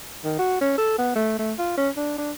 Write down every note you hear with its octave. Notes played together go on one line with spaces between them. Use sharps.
D#3
F#4
C#4
A4
B3
A3
A3
F4
C#4
D4
D4